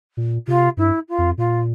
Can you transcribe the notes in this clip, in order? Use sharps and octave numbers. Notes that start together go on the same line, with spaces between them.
A#2
C3 F4
G2 E4
F4
F2
A#2 F4